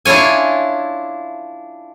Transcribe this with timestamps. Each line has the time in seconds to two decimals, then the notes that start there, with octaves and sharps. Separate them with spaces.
0.05 D4 E4 F4 C#5 G#5